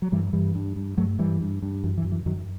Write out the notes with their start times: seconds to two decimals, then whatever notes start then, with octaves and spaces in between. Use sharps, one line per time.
0.02 F#3
0.12 G2 E3 G3
0.33 G2 E3 G3
0.55 G2
0.76 G2
0.97 G2 F#3 A3
1.19 G2 E3 G3
1.41 G2
1.62 G2
1.84 F#2 E3
1.98 E3
2.04 F#2
2.12 E3
2.26 F#2 D#3 F#3